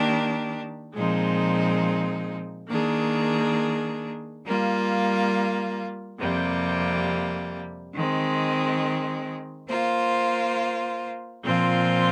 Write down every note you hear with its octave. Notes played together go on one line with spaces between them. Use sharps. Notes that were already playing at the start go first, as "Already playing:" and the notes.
Already playing: D#3 A#3 D4 G4
A#2 F3 G#3 C4 D#4
D#3 A#3 D4 G#4
G3 A#3 F4
F2 C3 G3 A#3
D#3 G#3 C4
A#3 F4 C5
A#2 F3 C4 F4 C5